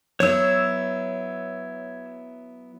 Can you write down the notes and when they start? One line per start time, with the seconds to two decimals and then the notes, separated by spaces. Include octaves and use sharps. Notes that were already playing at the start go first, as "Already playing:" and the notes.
0.20 F#3 B3 E4 C#5 E6